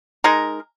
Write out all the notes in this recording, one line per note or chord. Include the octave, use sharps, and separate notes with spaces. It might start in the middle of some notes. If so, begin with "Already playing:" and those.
G#3 D#4 A#4